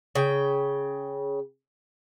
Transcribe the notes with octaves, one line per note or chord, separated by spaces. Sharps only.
C#3 G5